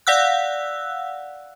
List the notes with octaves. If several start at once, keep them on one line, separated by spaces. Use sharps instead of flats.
D5 F5 F#5 E6 F#6